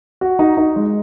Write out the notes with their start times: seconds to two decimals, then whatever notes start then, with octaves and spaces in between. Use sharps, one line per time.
0.21 F#4
0.39 D#4
0.57 D#4
0.76 G#3